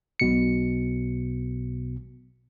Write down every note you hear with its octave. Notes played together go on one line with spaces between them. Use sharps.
B1 B2 C#7